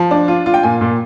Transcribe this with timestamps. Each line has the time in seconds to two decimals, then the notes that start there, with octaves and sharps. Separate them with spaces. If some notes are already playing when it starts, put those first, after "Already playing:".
Already playing: F3
0.11 D4
0.28 F4
0.46 F4
0.54 G5
0.63 A#2 G#5
0.81 A#2